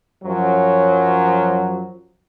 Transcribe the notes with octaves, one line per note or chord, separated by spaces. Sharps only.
F#2 F3 F#3